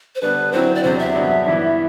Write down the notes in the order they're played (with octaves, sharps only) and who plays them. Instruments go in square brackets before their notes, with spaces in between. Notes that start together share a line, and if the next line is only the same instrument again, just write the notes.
[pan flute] C5
[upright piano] D3 G3 B3 D4 [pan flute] B4
[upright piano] D3 F#3 C4 E4 [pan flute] C5
[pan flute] D5
[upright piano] E2 C3 F#3 [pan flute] C5
[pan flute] E5
[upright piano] G2 F#3 B3 D4
G2 E3 B3 E4